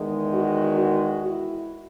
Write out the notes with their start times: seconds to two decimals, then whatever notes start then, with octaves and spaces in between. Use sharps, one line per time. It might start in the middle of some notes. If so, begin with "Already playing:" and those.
Already playing: E2 D#3 G#3
0.32 F#4
0.80 F#4
1.28 E4